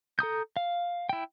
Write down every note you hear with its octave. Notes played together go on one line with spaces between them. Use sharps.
A4 A#5 D#6 G6
F5
E4 G5